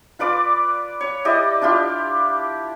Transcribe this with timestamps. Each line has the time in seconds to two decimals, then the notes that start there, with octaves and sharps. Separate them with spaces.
0.19 F4 B4 D5 D6
1.01 C#5
1.25 E4 G4 D5 D#5
1.62 D4 E4 F4 G4